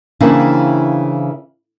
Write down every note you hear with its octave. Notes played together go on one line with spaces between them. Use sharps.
C#3 E3 A#3 C4 D4 E4